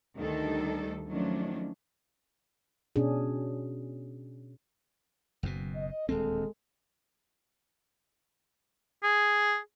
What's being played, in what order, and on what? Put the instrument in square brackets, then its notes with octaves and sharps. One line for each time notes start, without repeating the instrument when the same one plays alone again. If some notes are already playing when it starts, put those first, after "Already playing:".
[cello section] D2 D#3 G3 D4 D#4 A4
D#3 F3 F#3 A3 C#4 D4
[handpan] B2 C#4 D4 G#4
[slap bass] F#1 F#2 B2
[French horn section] D#5
[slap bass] D#1 D2 C4 [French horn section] G#3 A4
[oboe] G#4